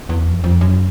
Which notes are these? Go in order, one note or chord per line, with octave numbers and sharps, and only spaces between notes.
E2
F2
F2
F#2